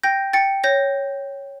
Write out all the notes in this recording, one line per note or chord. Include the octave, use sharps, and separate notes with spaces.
G5 G6 A#6
G5 A6 C#7
C#5 G6 A#6